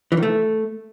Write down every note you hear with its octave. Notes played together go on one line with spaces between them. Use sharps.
E3
D#3
A3